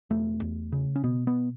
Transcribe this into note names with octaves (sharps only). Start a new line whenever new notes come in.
E1 A3
E2
C#3
C#4
B2 B3
B3